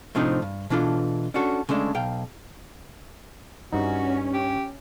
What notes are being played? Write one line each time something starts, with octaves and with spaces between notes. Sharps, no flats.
A2 C3 F3 C4 D4 D#4
G2
B2 E3 D4 F4 A4
C#4 D4 F#4 A4
C#3 G#3 A3 D4
B1 F5 G5
G2 C#4 D#4 F#4
G4